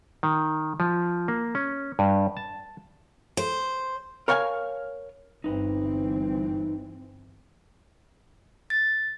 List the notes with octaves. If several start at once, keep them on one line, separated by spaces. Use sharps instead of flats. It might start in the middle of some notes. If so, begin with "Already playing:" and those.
D#3
F3
A#3
C#4
G2
A5
C5
A#4 C#5 F5 G5 G#5
G1 E3 C4 D#4 B4
A6